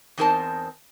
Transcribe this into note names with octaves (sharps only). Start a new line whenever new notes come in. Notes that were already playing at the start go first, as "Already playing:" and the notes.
E2 C4 D#4 A#4 C5 A5